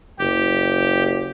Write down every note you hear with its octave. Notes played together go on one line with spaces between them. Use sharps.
F#1 G4